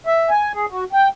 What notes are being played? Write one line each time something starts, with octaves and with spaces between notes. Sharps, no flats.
E5
G#5
G#4
F#4
G5